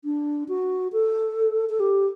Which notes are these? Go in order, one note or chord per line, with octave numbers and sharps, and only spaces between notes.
D4
F#4
A4
A4
G4